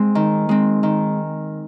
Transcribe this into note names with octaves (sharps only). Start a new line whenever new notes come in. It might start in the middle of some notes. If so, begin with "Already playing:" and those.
Already playing: G#3 C4
D#3
G#3 C4
D#3